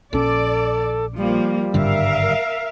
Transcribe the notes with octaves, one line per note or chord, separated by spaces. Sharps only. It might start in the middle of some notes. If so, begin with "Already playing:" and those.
A#1 C#4 A4 D5
F3 G3 A#3
G#1 G2 D3 A#4 E5 F5